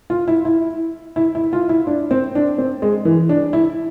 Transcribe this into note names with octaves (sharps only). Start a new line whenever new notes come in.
F4
E4
E4
E4
E4
F4
E4
D4
C4
D4
C4
G#3
E3
D4
E4